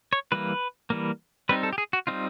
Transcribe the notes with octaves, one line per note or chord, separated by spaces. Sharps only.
C#5
E3 G3 A#3 B4
E3 G3 A#3
G3 C4 D#4 B4
A4
G4
G#4
F#4
G3 C4 D#4 F4